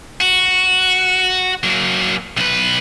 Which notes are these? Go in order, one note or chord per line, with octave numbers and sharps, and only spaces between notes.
F#4
F#3 A#3
B1 B4